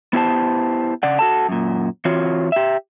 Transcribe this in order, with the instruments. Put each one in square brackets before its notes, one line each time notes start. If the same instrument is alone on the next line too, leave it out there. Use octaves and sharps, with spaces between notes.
[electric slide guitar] B3 E4 G4 C5 A5
C#3 D5 F#5
F#4 A4 A5
F#2 A#2
E3 C4 F4 F#4 C#5
G4 E5